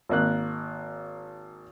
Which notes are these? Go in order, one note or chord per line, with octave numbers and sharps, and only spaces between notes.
G#1 A#3 F#6